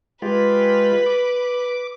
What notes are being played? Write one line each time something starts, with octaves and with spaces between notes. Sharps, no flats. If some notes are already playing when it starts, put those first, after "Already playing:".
G#3 F4 G4 B4
D6